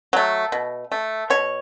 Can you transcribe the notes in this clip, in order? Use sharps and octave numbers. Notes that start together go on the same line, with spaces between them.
F#3 A3
B2
A3
B2 C#5